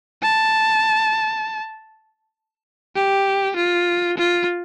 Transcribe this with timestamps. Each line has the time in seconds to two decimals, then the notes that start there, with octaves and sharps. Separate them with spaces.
0.22 A5
2.96 G4
3.56 F4
4.17 F4